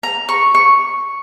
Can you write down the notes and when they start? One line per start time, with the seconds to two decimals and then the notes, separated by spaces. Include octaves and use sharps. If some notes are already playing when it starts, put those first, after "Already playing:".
0.03 A#5
0.29 C#6
0.55 C#6